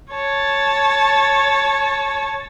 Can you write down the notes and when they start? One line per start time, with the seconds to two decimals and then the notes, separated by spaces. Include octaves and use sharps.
0.12 C#5 A5